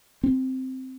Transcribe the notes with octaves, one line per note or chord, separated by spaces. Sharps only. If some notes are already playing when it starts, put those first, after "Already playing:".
C4